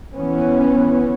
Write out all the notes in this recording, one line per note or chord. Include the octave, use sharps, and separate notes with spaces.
E3 B3 C#4